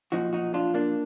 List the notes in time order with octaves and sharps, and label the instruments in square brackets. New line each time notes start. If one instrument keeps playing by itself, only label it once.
[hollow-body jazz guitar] B1 A#2 F3 D#4 F#4
D#4 F#4
D4 F4
A#3 D4